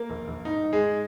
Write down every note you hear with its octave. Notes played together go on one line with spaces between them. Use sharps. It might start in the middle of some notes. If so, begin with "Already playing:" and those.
Already playing: A#3 A#4
A#1
A#1
G#2 D#4
G#2
G#3 G#4
G#2